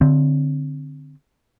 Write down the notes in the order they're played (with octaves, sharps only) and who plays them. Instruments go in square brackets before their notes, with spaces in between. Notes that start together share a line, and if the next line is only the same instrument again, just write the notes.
[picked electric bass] D3 C4